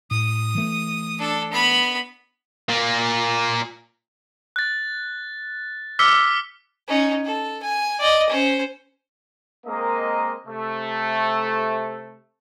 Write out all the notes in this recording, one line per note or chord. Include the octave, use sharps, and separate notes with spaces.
A2 D#6
E3 A3
D4 A4
B3 B5
A#2 A#3
F#6 A6
D6 E6 F6 B6 C#7 G7
C#4 D#4
A4
G#5
D5 D#5
C#4 C5
G#3 A#3 C4 A#4 D#5
C3 A3